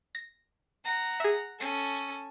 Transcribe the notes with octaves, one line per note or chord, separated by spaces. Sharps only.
A#6
F#5 A#5
G#4 E5
C#4 A4